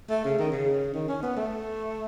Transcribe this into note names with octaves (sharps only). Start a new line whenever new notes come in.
A3
C#3
D#3
C#3
D#3
C#4
B3
A3